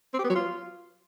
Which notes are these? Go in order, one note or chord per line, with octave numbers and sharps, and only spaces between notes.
C4
G4
B3
F#3
F4